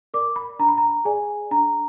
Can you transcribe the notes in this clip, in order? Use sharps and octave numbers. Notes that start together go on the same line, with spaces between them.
A#4 D5 D6
B5
D4 A#5
B5
A#5
G#4 D5 G#5
D4 A#5